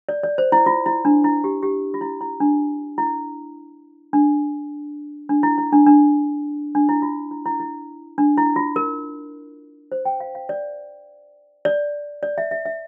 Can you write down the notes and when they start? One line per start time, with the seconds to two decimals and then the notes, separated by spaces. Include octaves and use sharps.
0.09 D5
0.23 D5
0.38 C5
0.52 E4
0.66 F4
0.86 E4
1.05 D4
1.24 E4
1.44 G4
1.62 G4
1.94 F4
2.01 E4
2.21 E4
2.40 D4
2.98 E4
4.13 D4
5.29 D4
5.43 E4
5.58 E4
5.72 D4
5.86 D4
6.75 D4
6.89 E4
7.02 F4
7.31 E4
7.46 E4
7.60 E4
8.18 D4
8.38 E4
8.56 F4
8.76 A#4
9.92 C5
10.05 G5
10.20 F5
10.35 F5
10.49 D5
11.65 D5
12.23 D5
12.38 E5
12.51 E5
12.66 E5